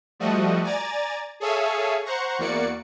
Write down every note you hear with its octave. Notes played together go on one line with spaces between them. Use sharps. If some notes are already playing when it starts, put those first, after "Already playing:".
F3 G3 A3 F#4 D#5
D5 G#5 A#5 A6
G#4 A4 C#5 E5 F5 G#5
C5 F#5 A#5 C#6
E2 A#3 F#4 D5 C#7